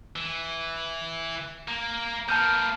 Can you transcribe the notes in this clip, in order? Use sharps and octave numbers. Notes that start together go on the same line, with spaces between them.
E3
A#3
B2 A#3 A5 F6 G6